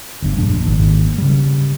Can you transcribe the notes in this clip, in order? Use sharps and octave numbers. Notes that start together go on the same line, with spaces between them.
G1 G2
F1 A#1 G#3 D4
G#1 A#3 D4
C#3 G3